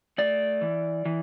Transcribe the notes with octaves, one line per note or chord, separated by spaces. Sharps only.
A3 D5
E3
E3